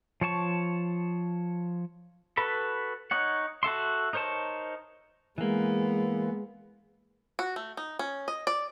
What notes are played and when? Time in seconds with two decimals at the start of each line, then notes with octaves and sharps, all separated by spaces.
0.21 F3 C#5 A5 C#6
2.37 F#4 A4 B4 B5
3.11 D#4 C#5 F#5
3.63 F#4 A4 E5 C6
4.13 D#4 A#4 C5 C#5 A5
5.38 E3 G#3 A#3 B3
7.39 F#4
7.56 A3
7.77 D#4
7.99 C#4
8.28 D#5
8.47 D5